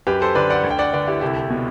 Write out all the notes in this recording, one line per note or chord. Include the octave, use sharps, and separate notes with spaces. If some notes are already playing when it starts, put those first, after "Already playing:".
F#2 G4 B4
A4 C5
D3 B4 D5
D5 F#5
D2
G5
D5 F#5
D3 B4 D5
E4 G4
C2 E4 G4
B2